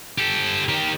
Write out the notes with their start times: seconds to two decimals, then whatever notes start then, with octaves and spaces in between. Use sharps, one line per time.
0.18 G4 A4
0.69 D#3 G4